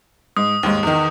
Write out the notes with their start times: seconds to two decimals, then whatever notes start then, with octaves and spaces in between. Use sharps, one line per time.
0.37 G#2 D#6
0.63 D#2 G#2
0.83 E2 D#3